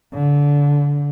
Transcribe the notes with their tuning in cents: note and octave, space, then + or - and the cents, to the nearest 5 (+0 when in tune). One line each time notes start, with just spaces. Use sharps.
D3 -25